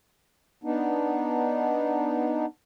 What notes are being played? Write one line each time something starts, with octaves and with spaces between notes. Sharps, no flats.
B3 D4 D#4